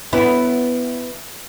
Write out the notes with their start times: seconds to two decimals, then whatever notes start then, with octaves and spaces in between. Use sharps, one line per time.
0.13 B3 E4